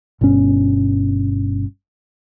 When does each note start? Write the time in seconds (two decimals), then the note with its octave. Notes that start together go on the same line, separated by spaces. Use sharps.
0.21 G1 G2 B2 C#4